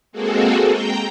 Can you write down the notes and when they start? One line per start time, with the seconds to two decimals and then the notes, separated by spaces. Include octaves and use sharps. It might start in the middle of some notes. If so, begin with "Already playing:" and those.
0.12 G#3 A#3 C4 F#4 G#4 A4
0.67 G5 A#5 G6